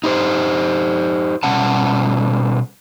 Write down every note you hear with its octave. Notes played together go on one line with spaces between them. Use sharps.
D#4 G4 C5
B2 G3 C#4 F#5 A5